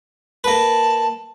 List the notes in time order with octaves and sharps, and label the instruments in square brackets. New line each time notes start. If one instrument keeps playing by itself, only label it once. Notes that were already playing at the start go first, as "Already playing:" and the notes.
[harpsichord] A#3 B4 [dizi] A5